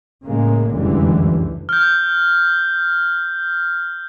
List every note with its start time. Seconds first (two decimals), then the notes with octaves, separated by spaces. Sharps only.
0.24 A2 C#3 G#3 A#3
0.70 F1 C#2 F#2 D3 E3 G3
1.69 F6 G6